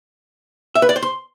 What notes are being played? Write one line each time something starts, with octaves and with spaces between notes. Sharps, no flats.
E5
B4
D5
C5
C6